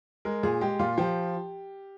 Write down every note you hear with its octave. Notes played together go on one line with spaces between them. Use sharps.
G#3 A#4
A#2 G#4
G#3 G4
A#2 F4
F3 G4